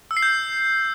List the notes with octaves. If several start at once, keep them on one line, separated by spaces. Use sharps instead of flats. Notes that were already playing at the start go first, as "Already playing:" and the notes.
E6
C7
G6